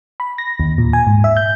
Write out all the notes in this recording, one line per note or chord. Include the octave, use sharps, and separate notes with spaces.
B5
A#6
D#2
A#2
G#5
G#2
E5
G6